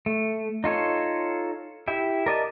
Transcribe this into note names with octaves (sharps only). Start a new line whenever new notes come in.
A3
D#4 F4 A4 C#5
E4 G4 E5
A#4 D5 D#5 A5